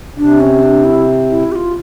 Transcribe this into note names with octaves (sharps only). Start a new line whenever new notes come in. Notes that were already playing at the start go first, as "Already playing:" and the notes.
C3 D4
C#4
D4
E4
E4
G4
F4